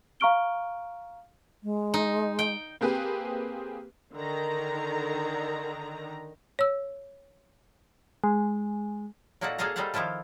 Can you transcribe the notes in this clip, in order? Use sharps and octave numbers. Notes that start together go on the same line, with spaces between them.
F5 A#5 C#6 F6 D7 G7
G#3
D#4
G5
A#3 C4 G4 G#4 B4
D3 D#3 A#5
C#5 E6
G#3
A#2 A#3 D#4 F#4 A4 F#5
A#3 G#4 A4 D#5 F5 A#5
G3 D#4 A4 C5 F5 F#5
D#3 F3 E4 F4 A4